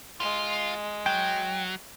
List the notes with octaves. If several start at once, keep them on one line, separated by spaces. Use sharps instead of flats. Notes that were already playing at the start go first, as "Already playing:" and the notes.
G#3 F4
F#3 G5